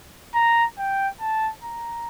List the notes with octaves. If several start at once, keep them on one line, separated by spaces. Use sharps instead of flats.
A#5
G5
A5
A#5